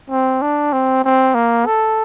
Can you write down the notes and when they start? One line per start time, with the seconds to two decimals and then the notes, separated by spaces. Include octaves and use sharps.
0.10 C4
0.42 D4
0.73 C4
1.05 C4
1.35 A#3
1.67 A4